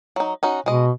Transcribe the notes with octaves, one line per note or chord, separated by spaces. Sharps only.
F#3 D#4
C#4 D#4 F#4
B2 G#3 D#5